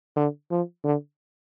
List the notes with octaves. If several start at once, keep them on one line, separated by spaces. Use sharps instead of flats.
D3
F3
D3